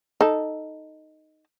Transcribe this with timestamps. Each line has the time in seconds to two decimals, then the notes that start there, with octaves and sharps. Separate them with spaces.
0.21 D#4 A4